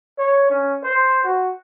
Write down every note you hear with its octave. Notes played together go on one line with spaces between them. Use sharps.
C#5
C#4
C5
F#4